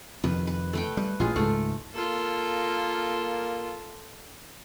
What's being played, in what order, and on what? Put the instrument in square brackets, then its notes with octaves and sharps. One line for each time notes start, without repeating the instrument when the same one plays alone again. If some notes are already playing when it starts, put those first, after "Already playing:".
[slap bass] F2 C3 D#3 [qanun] B4
[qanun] B4
A3 B4 G5
[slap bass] G3 [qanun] B4
[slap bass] A1 A#2 [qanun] F4 G#4
[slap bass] C#2 G#2 [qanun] A3
[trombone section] A#3 [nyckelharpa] F4 A4